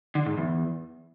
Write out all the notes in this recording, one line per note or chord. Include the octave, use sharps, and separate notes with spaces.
D3
G#2
E2